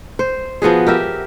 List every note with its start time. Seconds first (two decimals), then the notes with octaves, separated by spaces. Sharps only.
0.19 C5
0.62 F3 B3 F#4 G#4
0.87 G4 A#4 E5